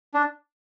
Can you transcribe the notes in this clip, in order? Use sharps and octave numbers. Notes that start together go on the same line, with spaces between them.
D4